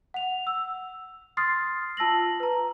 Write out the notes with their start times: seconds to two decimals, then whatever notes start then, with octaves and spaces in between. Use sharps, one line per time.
0.14 F#5 F7
0.47 E6
1.37 C6 D#6 F6 A6 C7
1.97 F4 A5 E6 A#6 F#7
2.40 B4 A#5